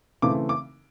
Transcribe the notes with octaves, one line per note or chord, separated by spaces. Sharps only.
C#3 E3 A3 C4 D6
D6